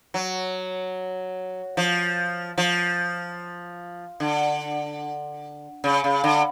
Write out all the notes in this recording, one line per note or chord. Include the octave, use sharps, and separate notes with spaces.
F#3
F3
F3
D3
C#3
C#3
D3